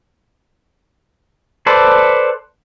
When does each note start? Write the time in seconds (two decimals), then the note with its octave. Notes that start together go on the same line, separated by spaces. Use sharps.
1.66 A4 B4 C5 D5